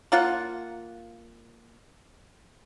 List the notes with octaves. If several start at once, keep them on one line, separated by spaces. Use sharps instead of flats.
A#3 F4 F#5